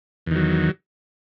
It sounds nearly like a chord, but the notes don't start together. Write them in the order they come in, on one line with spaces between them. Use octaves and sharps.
E2 D#3 F#3